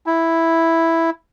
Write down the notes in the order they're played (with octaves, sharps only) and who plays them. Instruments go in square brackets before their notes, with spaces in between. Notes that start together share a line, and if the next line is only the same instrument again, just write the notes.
[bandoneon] E4